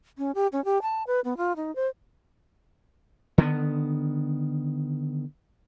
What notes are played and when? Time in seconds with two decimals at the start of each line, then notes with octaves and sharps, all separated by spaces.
0.18 C#4
0.35 G4
0.52 C#4
0.65 G4
0.82 A5
1.07 B4
1.24 B3
1.37 F4
1.56 D#4
1.76 C5
3.38 D3 D#3 A3 B3